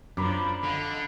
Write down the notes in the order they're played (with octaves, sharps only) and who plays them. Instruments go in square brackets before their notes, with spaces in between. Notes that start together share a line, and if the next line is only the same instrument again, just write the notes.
[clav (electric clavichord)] F#2 [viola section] F3 C#4 D4 [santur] A#5 B5 D6
[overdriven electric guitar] D3 [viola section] D#5 F5